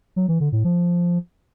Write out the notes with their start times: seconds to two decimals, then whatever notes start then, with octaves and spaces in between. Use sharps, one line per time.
0.16 F#3
0.28 E3
0.40 D3
0.52 A2
0.64 F3